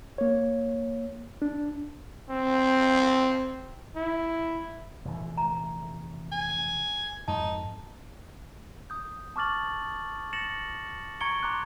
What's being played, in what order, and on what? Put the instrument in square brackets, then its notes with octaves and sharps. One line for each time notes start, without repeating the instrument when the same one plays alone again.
[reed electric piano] A#3 C#5
D4
[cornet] C4
E4
[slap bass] F1 A#2 E3
[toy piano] A#5
[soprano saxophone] G#5
[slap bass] F2 G#2 [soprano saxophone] D#4 [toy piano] A5
[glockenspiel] D#6 G6
A5 C#6 D6 F6 A6 F#7
A6 A#6 C#7 E7 F#7
A#5 C#6 G#6 C#7 D7 G7
A#5 C6 D6 F#6